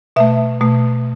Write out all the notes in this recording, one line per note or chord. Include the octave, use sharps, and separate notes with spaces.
B2 A3 E5
B2 A3